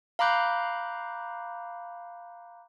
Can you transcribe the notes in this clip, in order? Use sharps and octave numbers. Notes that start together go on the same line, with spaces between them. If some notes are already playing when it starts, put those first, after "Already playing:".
F5 A#5 B5 D6 F#6 G6